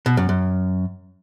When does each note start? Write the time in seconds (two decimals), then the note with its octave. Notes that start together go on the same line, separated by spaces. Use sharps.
0.06 B2
0.17 F#2
0.29 F#2